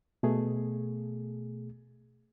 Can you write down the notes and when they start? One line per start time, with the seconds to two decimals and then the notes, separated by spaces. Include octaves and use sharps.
0.23 B2 A3 G#4